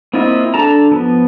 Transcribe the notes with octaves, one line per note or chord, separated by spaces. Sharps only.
A#3 C4 E4 F4 D#5
D4 A4 A5 A#5
F3 B3